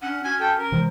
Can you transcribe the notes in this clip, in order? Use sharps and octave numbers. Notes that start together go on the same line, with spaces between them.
C#4 D4 F#5
C#4 F#4 G#5
A4 G5
A#4
C3 E3 G#3 C5